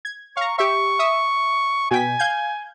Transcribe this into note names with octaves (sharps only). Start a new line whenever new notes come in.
G#6
F5 A#5 C#6
G4 E5 C#6
E5 D#6
B2 G5 G#5 B6
F5 G6 G#6